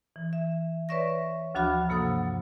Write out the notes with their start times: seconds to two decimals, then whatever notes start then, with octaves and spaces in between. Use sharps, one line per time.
0.16 E3
0.33 E5
0.89 B4 C#5 D5 E5 C#6 A#6
1.55 D2 F3 D4 F#4 B5 F6
1.89 G2 C3 A#3 A4 F#5 D#6